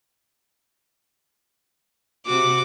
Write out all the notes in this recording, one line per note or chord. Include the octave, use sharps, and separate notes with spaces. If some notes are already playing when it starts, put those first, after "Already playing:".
C3 F#4 D6